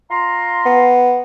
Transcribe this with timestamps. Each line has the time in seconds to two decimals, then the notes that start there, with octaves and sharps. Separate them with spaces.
0.11 F4 A#5 C6
0.65 B3